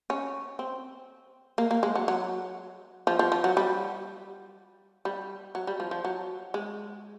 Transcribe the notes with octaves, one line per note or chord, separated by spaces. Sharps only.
C#4
C4
A#3
A#3
G#3
F#3
F#3
F3
F3
F3
F#3
G3
G3
F#3
G3
F3
F3
F#3
G#3